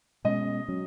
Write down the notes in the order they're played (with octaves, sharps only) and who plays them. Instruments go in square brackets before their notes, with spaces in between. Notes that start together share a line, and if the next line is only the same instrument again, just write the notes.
[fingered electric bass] B2 G#3 C#4 [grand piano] D#5
[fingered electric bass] F#3 C#4